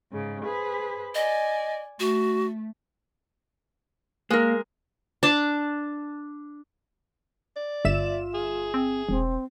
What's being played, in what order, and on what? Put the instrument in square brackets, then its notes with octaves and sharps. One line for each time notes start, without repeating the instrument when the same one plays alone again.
[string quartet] G#2 C#3
G#4 B4 C5
[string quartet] D5 G#5 [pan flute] D#5
[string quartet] A3 [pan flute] F#4
[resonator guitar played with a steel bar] G#3 A#4 [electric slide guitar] A#3
[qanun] D4 A5
[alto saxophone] D5
[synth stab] G1 E5 E7 [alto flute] F4
[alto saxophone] G#4
[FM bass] C4
[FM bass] E1 [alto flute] C4